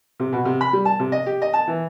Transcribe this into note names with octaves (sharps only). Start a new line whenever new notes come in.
C3
B2
C3
B5
G3
A5
C3
D#5
G4
D#5
A5
E3